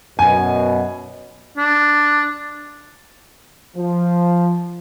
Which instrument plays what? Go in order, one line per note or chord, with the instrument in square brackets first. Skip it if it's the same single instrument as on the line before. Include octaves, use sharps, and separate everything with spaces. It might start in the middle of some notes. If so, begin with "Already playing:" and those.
[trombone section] F#2 B2 [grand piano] G#5
[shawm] D4
[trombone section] F3